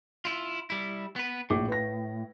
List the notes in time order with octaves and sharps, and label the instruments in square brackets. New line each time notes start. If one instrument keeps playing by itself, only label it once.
[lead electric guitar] E4 F4
G3 E4
B3 B4
[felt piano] A#1 D6 [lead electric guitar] A2
[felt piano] B4 A#6